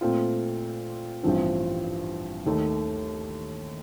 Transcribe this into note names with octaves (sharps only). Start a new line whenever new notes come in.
A#2 A3 C4 F4
A1 G2 F3 C4
D#2 D#3 A3